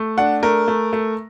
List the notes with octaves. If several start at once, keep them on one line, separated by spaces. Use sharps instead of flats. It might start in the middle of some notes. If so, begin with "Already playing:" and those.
Already playing: A3
D4 F#5
A3 A#4
A3
A3